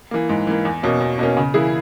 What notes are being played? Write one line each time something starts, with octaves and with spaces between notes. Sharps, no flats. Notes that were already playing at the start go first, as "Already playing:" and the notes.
E3 A#3
G#2
E3 A#3
E2
B2 A#3 C#4
E2
B2 A#3 C#4
C#3
E3 A#3 E4 G#4